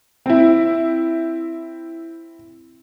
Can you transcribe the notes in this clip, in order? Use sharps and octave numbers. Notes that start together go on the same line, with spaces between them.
C4 E4